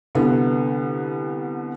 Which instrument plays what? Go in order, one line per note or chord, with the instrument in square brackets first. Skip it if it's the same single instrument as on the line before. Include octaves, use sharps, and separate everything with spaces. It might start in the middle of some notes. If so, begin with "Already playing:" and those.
[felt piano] C2 D3 B3